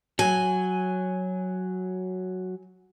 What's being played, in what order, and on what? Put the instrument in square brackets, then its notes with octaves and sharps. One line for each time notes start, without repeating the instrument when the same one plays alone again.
[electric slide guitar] F#3 [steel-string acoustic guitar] G#5